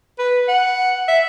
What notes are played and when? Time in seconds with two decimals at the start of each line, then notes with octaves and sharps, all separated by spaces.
0.19 B4
0.48 F#5
1.08 E5